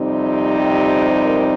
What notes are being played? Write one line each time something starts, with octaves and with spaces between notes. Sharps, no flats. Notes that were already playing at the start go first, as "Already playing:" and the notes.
Already playing: F2 C3 G3 C4 D#4
G4
A#4